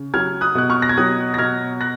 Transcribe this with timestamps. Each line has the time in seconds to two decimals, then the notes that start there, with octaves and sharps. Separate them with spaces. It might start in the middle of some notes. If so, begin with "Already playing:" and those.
Already playing: C#3
0.14 F#3 F6 G#6
0.41 D#6 F#6
0.55 B2 F#6
0.70 C#6 F6
0.82 A#6
0.89 G#6
0.97 F#3 D#6 F#6
1.34 A#6
1.38 B2 F6 G#6
1.81 F#6 A#6